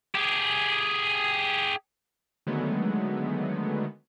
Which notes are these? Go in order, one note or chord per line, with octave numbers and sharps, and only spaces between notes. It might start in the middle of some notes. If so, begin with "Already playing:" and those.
G4 G#4
D3 D#3 F#3 G#3 A3 B3